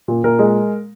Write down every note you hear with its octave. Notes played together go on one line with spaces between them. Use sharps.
A#2
A#2 A#4
G#3